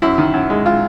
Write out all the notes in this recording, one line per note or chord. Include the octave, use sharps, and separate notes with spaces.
F#2 E4
D#3
F#2
G#3
G#3 F4